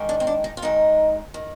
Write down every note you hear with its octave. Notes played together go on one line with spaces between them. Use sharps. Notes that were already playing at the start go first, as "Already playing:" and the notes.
Already playing: G#2 D#3
D4
C4
D4
D#4
F4
G#2 D#3 D#4
D#3